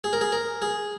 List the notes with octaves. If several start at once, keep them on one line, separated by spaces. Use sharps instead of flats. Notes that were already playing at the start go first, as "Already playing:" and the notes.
G#4
A#4
G#4
A#4
G#4